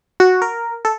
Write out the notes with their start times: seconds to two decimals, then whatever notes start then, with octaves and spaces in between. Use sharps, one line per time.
0.20 F#4
0.42 A#4
0.85 A4